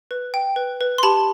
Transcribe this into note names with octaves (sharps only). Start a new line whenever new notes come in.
B4
G5
B4
B4
C6
G4 A5 B5